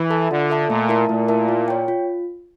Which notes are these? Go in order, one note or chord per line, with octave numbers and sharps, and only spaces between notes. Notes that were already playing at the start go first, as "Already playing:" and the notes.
Already playing: E3
A4 E5 A5
D3 F4
A4 E5 A5
A#2 A3
E4 A#4 E5 A5
A#2 A3
E4 A#4 E5 A5
F4
C#5 G5
F4